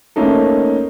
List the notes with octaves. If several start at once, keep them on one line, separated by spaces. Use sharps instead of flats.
A3 A#3 C#4 D#4 A4